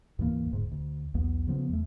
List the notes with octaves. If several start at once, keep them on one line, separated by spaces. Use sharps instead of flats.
D2 G#2 E3 A#3
D#1 D2 G#2
D2
B1 E2 B3
C#3 F3 B3
E2 A3